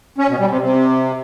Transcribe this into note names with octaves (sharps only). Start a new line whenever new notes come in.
C#4
B2
G3
C3
C3